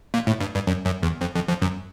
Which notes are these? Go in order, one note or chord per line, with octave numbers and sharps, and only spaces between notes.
A#2
A2
G2
G2
F#2
F#2
E2
F2
F2
F2
F#2